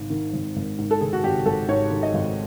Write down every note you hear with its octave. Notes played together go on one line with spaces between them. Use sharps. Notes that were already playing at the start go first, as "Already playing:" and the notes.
Already playing: G#1 G#2
D#3
G#1
G#1
G#2
A4
D#3 G#4
F#4
G#1 G4
G#1 A4
G#2 C#5
D#3
D#5
G#1